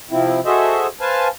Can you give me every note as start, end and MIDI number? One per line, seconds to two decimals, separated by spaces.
0.11 0.40 48
0.11 0.40 53
0.11 0.40 60
0.11 0.40 64
0.45 0.87 66
0.45 0.87 68
0.45 0.87 69
0.45 0.87 72
0.45 0.87 75
0.45 0.87 76
1.01 1.28 71
1.01 1.28 72
1.01 1.28 77
1.01 1.28 80
1.01 1.28 81